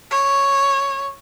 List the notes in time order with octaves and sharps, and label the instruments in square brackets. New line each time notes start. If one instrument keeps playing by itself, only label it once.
[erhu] C#5